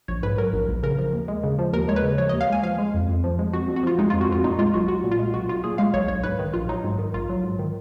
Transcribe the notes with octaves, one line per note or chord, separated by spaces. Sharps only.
A#1 C#5
G#2 B4
F#3 A#4
A#1
A#1
C#3 A#4
F3
D#2
G#3
C#3
F3
D#2 A#4
G#3 C#5
B4
C#3
F3 C#5
D#5
D#2
F5
G#3 G#5
F3 F5
G#3
F2
F2
F3
G#3
F2 F#4
F2
F#4
F3 F4
G#3 D#4
F4
F2
F#4
F2 F4
A#2 D#4
G#3 F4
B1 F#4
B1 F#4
A#2
F4
G#3
B1 F#4
B1 F4
A#2 G#4
G#3 F5
B1 C#5
B1 C#5
G#2 B4
D#3
A#1 F4
F#3 D#4
G#2
D#3
A#1 F4
F#3
G#2
D#3